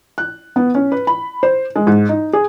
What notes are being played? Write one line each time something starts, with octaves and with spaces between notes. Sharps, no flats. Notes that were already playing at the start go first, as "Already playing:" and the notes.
F#6
B3
C#4
B4
B5
C5
G#3
G#2
D#4
G#4